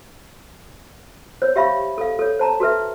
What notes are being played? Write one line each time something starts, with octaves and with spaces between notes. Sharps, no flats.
C5 C#5
G4 E5 F5 B5 C#6
A4 F5
A4 C#5
C5 A5 A#5
F#4 A4 B4 E5